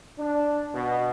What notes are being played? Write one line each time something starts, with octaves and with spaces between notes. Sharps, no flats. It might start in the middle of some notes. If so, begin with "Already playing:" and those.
D4
B2